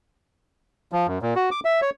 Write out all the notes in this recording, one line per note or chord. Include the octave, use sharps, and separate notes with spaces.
F3
F#2
A#2
F#4
D6
E5
C#5